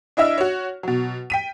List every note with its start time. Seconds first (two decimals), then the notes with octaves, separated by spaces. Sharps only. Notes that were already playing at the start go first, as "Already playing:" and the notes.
0.17 D4 E4 D#5 E5 E6 F6
0.38 F#4 C#5
0.83 B2 F#3
1.30 G5 B6 D#7